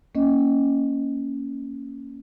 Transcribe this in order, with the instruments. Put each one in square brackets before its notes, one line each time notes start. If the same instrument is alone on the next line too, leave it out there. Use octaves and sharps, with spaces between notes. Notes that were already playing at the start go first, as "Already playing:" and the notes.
[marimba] A#3 C#4 D#5